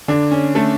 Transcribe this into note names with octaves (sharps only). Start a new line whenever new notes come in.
D3 D4
C#4
A3 A4